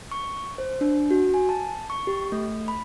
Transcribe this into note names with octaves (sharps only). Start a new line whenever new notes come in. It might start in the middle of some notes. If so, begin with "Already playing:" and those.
C#6
C5
D4
F#4
G#5
A5
C#6
G4
A3
B5